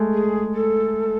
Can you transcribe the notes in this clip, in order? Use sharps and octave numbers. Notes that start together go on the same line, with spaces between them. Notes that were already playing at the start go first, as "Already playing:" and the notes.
Already playing: G#3 A3
G#4
A4